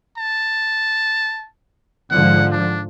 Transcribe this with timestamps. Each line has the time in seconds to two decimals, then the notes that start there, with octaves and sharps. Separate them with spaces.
0.18 A5
2.11 G#2 D3 F3 F#5
2.52 D4